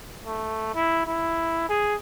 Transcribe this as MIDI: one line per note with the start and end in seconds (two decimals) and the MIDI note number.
0.25 0.73 57
0.75 1.06 64
1.07 1.68 64
1.69 1.95 68